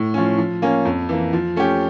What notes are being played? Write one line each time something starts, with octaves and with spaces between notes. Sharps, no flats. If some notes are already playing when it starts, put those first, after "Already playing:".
Already playing: A2
F3 C#4
F3
A#3 C#4
F2
E3 A#3
F3
A3 C#4 G4